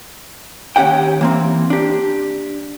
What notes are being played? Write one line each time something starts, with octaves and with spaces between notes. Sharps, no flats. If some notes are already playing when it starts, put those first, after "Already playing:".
D#2 C#4 G4 F#5 G5
E3 A#3 C4
D4 G4